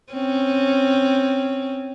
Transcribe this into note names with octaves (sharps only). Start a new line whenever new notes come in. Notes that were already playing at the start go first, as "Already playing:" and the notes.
C4 C#4